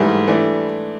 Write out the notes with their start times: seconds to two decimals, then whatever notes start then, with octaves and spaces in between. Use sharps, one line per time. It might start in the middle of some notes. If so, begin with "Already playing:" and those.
Already playing: G#2 E3 G3 A3
0.27 E3 A3 D4